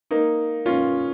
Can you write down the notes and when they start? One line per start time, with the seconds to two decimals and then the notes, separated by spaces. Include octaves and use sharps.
0.11 A#3 D#4
0.66 C#4 F4